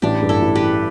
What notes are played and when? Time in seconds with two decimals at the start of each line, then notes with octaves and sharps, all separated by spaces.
0.02 A1 D4 G4
0.22 G2
0.29 E4 A4
0.42 A1
0.55 G4 B4
0.62 E3